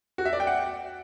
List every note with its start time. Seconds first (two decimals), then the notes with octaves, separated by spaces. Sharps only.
0.18 F#4
0.25 E5
0.33 D5
0.40 G5
0.47 F#5